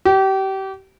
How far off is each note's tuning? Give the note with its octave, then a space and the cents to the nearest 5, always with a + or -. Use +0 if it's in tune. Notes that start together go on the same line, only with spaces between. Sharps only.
G4 -30